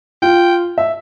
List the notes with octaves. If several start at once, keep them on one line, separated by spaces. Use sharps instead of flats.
F4 G5
E5